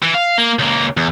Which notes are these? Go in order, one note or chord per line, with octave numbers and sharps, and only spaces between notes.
E3
F5
A#3
C#2 A#3
E2